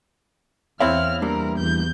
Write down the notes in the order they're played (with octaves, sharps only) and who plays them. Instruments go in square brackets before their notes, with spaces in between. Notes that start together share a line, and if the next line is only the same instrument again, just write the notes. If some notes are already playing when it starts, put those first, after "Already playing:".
[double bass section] E2 [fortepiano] C4 E4 [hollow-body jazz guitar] C#5 F5 [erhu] F6
[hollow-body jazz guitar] G3 A#3 D4 [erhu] A#4
[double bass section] E2 [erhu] G6